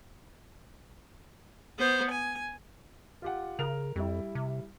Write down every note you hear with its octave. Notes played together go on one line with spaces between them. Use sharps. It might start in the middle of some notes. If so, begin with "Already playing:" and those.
B3 C5
G#5
F4 G4 F#5
C#3 A#4 F7
F2 G3 E4
C3